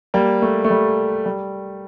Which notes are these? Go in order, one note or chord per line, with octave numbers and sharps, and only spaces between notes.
G3 A#3
A3
A3
G3
G3